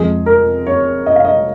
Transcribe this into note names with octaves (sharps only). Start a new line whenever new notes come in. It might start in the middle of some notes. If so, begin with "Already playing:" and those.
Already playing: F2 F3 G#3 G#4
A#4
C#5
D#5
F5
D#5